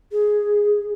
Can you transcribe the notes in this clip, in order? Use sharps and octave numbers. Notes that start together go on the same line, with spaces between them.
G#4